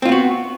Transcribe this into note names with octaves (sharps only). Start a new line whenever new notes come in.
B3 C4 F4 F#4